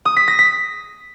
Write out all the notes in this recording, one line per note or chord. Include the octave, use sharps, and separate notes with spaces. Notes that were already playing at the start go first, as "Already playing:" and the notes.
D#6
B6
A#6
B6